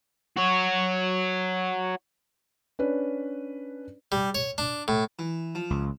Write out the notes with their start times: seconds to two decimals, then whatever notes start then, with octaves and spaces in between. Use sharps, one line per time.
0.37 F#4 C#5
2.79 C#4 D4 B4
4.12 G3
4.35 C#5
4.58 D4
4.88 A2
5.19 E3
5.55 F3
5.70 C#2